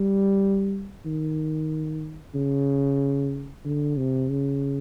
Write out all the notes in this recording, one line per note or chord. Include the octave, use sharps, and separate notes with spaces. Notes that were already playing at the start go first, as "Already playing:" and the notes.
Already playing: G3
D#3
C#3
D3
C3
C#3